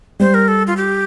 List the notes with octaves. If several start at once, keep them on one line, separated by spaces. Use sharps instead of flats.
G3 C5
A#4
A4
F4
G4